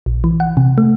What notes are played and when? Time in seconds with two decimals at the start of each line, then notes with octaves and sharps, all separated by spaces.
0.06 A#1
0.24 E3
0.40 F#5
0.57 C3
0.78 A3